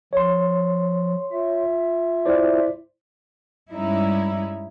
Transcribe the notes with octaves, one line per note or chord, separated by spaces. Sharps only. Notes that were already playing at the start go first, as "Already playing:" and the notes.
F3 C#5 C6
F4 E5
E4 C5 D5
G2 G3 G#3 C#4 D#4 E4